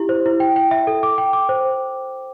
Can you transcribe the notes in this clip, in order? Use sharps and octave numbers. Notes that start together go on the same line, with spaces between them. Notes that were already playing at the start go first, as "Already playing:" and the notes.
Already playing: E4 G4
C5
E4
G5
G5
E5
A4
D6
G5
D6
C5